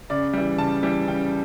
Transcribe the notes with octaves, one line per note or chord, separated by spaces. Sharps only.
C#3 D5
E3 G3
C#3 A5
E3 G3
C#3 G5